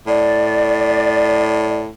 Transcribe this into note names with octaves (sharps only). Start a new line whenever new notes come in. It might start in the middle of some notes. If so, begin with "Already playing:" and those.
A2 D5